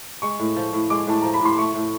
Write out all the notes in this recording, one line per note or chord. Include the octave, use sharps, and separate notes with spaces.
G#3 C#6
A2
F3
A2
G#3 D6
A2 A5
F3 A#5
B5
A2 C6
A3 C#6
A2